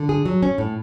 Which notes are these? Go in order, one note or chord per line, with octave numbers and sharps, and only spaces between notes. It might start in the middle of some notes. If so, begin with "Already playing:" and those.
Already playing: D3
G#4
F#3
C#4
A2